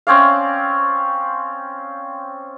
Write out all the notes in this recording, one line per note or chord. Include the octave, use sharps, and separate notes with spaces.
C4 C#4 D5 F5